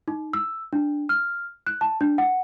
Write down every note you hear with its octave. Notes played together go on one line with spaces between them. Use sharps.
D#4
E6
D4
F6
F#6
A5
D4
F#5